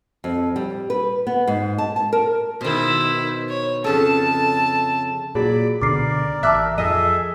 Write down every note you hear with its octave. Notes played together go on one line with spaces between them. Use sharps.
F2
G3
B4
B3
G#2
A5
A5
A#4
B2 D#3 E4 C5
C#5
F2 C#3 A4 A5
A#2 F#3 G#4 D5 B5 D6
C#2 B2 D3 A#4 D5 D6 C7
A1 E5 A5 D6 F6 F#6
F2 G#4 A4 D#5 E5 E6 D#7